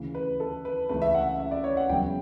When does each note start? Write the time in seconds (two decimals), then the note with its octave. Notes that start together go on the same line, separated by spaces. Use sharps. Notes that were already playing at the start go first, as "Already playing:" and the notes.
Already playing: D2 C#3 E3
0.15 B4
0.40 A4
0.65 B4
0.89 C#2 C#3 E3 A3 B4
1.02 E5
1.15 F#5
1.40 E5
1.51 D5
1.64 C#5
1.77 F#5
1.89 E1 E2 C#3 F#3 G5